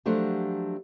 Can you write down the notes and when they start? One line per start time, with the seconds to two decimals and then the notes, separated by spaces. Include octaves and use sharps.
0.06 F3 F#3 A3 D4 G4